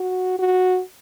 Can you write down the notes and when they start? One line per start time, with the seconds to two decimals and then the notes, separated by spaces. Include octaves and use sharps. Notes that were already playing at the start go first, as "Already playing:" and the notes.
Already playing: F#4
0.39 F#4